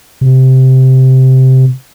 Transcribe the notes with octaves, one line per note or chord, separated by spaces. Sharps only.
C3